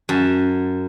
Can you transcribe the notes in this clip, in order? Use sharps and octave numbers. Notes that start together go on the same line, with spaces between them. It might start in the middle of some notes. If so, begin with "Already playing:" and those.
F#2 A5